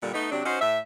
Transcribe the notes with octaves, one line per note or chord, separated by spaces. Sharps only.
A#2 D3 G3
A3 B3 D#4
C3 F#3 C4 D4
C#4 D#4 F#4 C5
A2 E5